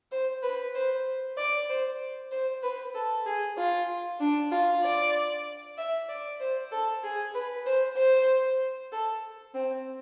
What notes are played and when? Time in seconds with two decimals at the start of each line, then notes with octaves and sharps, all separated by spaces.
0.12 C5
0.43 B4
0.75 C5
1.37 D5
1.69 C5
2.32 C5
2.63 B4
2.94 A4
3.26 G#4
3.58 F4
4.20 D4
4.52 F4
4.84 D5
5.78 E5
6.09 D5
6.40 C5
6.72 A4
7.04 G#4
7.34 B4
7.66 C5
7.97 C5
8.92 A4
9.54 C4